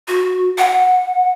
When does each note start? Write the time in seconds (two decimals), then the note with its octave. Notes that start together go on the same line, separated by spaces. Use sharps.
0.08 F#4
0.58 F#5